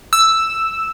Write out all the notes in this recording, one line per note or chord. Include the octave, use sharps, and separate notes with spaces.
E6